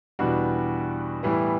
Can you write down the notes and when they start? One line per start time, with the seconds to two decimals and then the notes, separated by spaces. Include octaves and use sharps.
0.19 E2 B2 G3 D4 F#4
1.23 A2 E3 G3 B3 E4